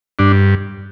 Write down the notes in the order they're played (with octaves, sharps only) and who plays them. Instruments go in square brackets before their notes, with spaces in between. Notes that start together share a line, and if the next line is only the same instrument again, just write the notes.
[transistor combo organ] G2 D4